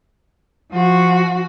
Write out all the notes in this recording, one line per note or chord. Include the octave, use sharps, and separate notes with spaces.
F3 F#4